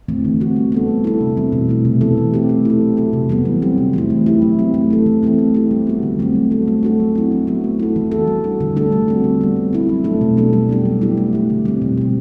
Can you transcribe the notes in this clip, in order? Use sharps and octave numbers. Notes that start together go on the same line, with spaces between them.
E3 A3 C4
D3
A3 C4 F#4
G3
B3 D4 A4
A3
E4 A4
C3
E3 G3 C4
B2
A3 E4
C3
E3 B3 E4 A4
A3
C4 G4
A3
E4 A4
F#3
C4 F#4 A4
C3
E3 G3 B3
F#3
C4 E4 G4
C3
E3 A3 E4
A3
E4 G4
F#3
C4 G4
A3
E4 A4
E3
A3 C4 E4 A4
A3
E4 G4
G3
B3 F#4
D3
F#3 A3 C4
G3
B3 F#4 A4
A3
D4 F#4 A4
F#3
C4 E4
F#3
B3 F#4
A3
E4 A4
E3
B3 F#4 A4
G3
D4 F#4
D3
A3 D4 A4
G3
C4 F#4
D3
G3 B3
G3
C4 E4
F#3
A3 D4 A4
B2
F#3 B3 D4 A4
G3
B3 D4 G4
F#3
B3 E4 G4
A3
E4 G4
D3
G3 C4
B2
G3 C4